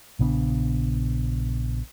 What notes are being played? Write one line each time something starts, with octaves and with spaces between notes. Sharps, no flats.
A#1 C#3 B3 D4